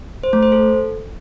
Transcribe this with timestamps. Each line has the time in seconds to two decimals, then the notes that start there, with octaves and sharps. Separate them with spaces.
0.23 C5
0.33 A3
0.43 C5
0.52 A4